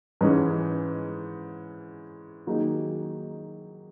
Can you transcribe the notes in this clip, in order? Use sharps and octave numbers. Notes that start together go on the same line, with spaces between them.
G#2 E3 G#3 C#4
D#3 F#3 A#3 D#4 G#4